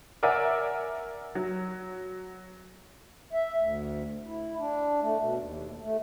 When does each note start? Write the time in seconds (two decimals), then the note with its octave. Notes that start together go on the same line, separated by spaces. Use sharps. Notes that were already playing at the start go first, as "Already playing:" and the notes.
0.23 A#4 C#5 D5 E5 F#5 G#5
1.35 F#3
3.33 E5
3.57 D2
4.26 E4
4.59 D4
5.00 A3
5.20 B2
5.37 D#2
5.83 A3